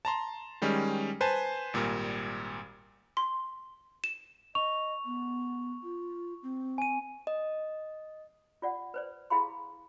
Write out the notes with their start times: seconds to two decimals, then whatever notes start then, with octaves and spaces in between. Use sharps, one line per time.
0.05 A5 A#5 C6
0.62 D#3 G3 G#3 C#4
1.21 B4 C5 G#5 A5
1.74 G#1 A#2 G3 A#4
3.17 C6
4.04 E7
4.55 D#5 C#6 F7
5.05 B3
5.83 F4
6.43 C4
6.78 G#5 D#7
7.27 D#5
8.62 F4 D5 F#5
8.94 B4 C5 D5
9.30 E4 G#4 F5 B5 C6